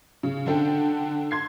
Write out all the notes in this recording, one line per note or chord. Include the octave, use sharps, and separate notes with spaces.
C#3
D3 D4 A4 G5
C6 G#6 C7